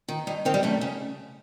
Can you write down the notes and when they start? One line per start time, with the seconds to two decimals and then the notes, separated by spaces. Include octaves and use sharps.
0.09 D#3
0.27 G2 D#4
0.45 D#3 C4
0.54 G3
0.63 F#2 A3
0.81 C#3